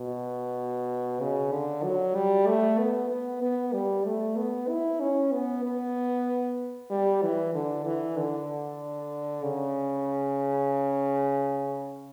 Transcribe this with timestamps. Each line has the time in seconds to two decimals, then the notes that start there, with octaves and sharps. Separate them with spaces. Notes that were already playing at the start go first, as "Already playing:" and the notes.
Already playing: B2
1.20 C#3
1.52 D3
1.83 F#3
2.15 G3
2.47 A3
2.79 B3
3.10 B3
3.42 B3
3.73 G3
4.05 A3
4.37 B3
4.69 E4
5.00 C#4
5.32 B3
5.64 B3
6.90 G3
7.22 E3
7.54 D3
7.85 E3
8.18 D3
9.44 C#3